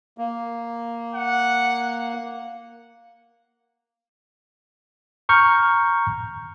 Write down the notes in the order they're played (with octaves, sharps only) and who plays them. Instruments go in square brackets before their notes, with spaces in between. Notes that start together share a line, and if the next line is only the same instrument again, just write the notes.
[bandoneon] A#3
[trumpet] F#5
[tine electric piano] A#5 C#6 F6 G6